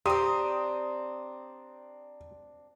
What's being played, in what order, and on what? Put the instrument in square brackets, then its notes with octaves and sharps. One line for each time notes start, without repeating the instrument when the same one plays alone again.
[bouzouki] C4 D4 [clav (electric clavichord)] G4 [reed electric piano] A#5 C6 [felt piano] D#6 D#7